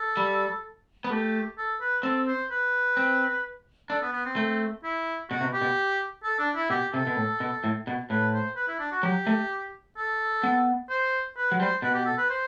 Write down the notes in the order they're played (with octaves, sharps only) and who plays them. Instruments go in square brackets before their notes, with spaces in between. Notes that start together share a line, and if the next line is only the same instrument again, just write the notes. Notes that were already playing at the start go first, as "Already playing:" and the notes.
Already playing: [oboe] A4
[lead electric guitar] G3
B3
[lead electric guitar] A3 [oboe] G4
[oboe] A4
B4
[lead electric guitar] C4 [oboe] A4
[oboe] C5
B4
[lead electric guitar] C4
[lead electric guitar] D4 [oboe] A4
[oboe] B3
B3
C4
[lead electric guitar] A3
[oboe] E4
[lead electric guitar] B2 [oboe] F#4
[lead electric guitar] C3
B2
[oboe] G4
[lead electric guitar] B2
[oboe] A4
D4
E4
[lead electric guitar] B2 [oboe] G4
[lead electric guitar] C3 [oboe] A4
[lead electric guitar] B2
A2
B2
A2
B2
[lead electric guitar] A2 [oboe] B4
[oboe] C5
B4
E4
D4
F#4
[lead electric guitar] F#3 [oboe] G4
[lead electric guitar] A3
[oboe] A4
[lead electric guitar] B3
[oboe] C5
B4
[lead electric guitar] F#3
[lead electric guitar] G3 [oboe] C5
[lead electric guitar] B2 [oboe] B4
[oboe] G4
A4
B4
C5